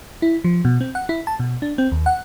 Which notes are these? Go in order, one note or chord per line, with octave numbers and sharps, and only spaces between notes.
E4
F3
B2
C4
F#5
E4
A5
B2
D4
C4
D#2
F#5